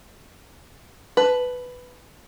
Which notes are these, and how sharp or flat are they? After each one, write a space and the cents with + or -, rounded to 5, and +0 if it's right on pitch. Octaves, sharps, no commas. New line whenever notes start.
B4 +5 A5 -10